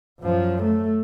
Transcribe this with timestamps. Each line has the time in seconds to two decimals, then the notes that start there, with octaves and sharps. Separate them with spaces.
0.20 F#2 F3
0.63 A3